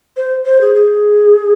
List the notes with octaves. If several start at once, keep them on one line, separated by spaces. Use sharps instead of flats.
C5
C5
G#4
G#4